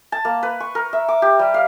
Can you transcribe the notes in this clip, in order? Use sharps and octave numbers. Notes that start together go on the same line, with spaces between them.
A5
A#3
B4
C#6
A#4
E5
D6
G4
G3
F5